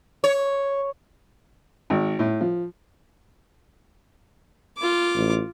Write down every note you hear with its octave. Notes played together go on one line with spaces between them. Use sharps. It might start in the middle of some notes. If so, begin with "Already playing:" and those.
C#5
G#1
A2
F3
F4 D6
A1